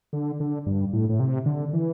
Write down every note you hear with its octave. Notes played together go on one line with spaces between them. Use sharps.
D3
D3
G2
A2
A2
C3
D3
E3